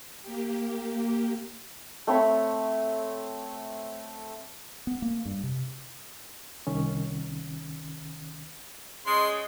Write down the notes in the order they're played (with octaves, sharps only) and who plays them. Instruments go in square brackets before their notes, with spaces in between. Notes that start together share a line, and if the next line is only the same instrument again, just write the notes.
[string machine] A#3 G4
[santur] A3 C4 C#5 B5
[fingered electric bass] B3
A#3
G2
C3
[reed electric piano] C2 D#3 C#4
[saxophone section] C#3 G#3 [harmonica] C6